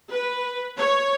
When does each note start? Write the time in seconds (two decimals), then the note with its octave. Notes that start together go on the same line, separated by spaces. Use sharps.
0.11 B4
0.77 C#5